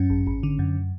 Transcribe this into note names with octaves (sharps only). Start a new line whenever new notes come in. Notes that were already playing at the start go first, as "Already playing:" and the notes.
Already playing: F#2 C#4
G#1
G#1
D3
F#2